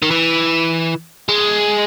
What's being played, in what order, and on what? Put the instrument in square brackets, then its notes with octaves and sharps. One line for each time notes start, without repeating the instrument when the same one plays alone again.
[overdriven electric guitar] D#3
E3
G#3